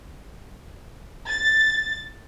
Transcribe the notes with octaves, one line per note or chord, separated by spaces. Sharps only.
A6